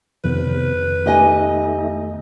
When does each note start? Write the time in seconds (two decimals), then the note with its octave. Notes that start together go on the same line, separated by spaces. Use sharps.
0.24 F2 C3 D#3 B3 B4
1.06 A3 D#4 G4 D#5 G#5